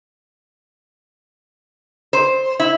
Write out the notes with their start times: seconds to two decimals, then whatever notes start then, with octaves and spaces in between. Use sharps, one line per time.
2.13 C5
2.60 E4